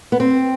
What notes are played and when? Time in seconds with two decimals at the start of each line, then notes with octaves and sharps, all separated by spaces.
0.12 B3
0.20 C4